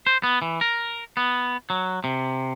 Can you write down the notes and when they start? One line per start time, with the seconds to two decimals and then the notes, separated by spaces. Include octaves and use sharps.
0.07 C5
0.23 B3
0.42 E3
0.61 A#4
1.17 B3
1.70 F#3
2.04 C3